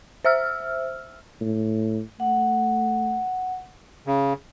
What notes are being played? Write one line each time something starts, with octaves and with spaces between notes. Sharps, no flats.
C5 E5 E6 F6
A2
A3 F#5
C#3